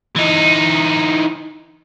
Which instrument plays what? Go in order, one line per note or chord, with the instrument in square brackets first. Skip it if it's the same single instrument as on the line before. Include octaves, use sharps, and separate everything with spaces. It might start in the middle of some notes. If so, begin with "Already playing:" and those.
[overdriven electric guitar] E3 D#4